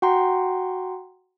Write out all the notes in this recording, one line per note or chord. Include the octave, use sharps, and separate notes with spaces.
F#4 F#5 G5 A#5 C6